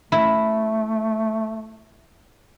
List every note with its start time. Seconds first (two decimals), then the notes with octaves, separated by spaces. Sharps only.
0.12 A3 E4